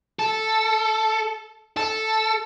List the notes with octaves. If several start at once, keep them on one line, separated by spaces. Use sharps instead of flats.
A4
A4